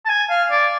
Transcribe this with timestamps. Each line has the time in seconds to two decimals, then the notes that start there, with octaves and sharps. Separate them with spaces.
0.05 A5
0.09 G#5
0.30 F5
0.51 D5